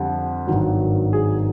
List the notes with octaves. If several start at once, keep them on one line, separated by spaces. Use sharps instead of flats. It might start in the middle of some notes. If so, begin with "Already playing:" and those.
Already playing: F2 D3 G3
G#1 G2 D#3 F#3
G#4